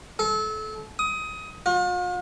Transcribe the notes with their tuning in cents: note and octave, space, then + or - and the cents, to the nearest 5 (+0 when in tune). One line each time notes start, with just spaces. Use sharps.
A4 -30
D#6 +20
F4 +45